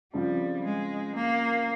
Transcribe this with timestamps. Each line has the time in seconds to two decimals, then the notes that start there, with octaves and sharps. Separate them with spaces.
0.14 C#3 F3 G3 C4 F4
0.64 G#3
1.15 A#3